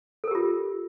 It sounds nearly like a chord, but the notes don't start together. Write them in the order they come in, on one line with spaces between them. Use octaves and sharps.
A4 A#4 G4 F4